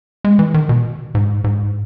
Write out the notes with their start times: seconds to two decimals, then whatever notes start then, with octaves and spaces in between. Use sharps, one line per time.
0.24 G#3
0.39 E3
0.54 D#3
0.69 B2
1.15 G#2
1.44 G#2